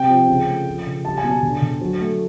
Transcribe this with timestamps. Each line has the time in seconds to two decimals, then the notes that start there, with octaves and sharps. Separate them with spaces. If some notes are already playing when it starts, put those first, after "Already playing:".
Already playing: C3 G5
0.09 F3
0.28 C#3
0.48 A3
0.66 F3
0.86 C#3
1.05 G3 A5
1.18 G#5
1.24 B2
1.30 A5
1.42 D3
1.62 D3
1.81 F#3
2.00 A3